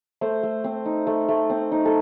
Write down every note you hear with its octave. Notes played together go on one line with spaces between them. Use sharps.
A3 C5
A3
C4
D#4
A3
A3
C4
D#4
A4